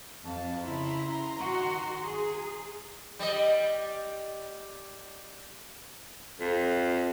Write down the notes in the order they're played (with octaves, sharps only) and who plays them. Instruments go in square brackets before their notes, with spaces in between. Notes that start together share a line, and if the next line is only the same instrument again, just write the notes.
[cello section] F2 [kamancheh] F5 A5
[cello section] C#3 E4 [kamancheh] A#5 C6
[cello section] D#3 F#4
G#4
[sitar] G3 D#5
[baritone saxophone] F2